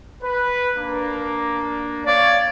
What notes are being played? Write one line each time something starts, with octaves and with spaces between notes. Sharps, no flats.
B4
A#3 D4
C#5 D5 F5